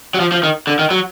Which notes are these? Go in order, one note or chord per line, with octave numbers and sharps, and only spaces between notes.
F#3
F3
F3
D#3
D3
D#3
F#3